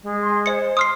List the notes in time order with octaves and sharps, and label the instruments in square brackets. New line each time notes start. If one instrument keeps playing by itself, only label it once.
[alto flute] G#3
[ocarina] C6
[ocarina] C5 [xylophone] D#5 C#7
[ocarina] C6 [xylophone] D#6 F6 C7